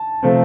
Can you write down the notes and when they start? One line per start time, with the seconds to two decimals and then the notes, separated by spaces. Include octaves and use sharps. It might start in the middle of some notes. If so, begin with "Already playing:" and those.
Already playing: A5
0.23 C3 F3 A3 C4